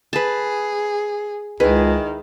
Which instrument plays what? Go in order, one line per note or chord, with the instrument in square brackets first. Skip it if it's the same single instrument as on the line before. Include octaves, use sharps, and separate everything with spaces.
[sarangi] G#4 [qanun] B4 A5
[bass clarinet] C#2 [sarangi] D#3 [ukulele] E4 B4 [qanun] G#4